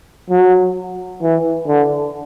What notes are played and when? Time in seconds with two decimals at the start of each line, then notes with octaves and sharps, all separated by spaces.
0.30 F#3
1.22 E3
1.67 D3